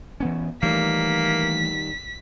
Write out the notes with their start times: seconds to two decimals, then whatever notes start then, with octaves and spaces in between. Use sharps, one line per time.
0.20 E3 B3 C#4
0.62 D#3 E3 G3 A3 A#3 B6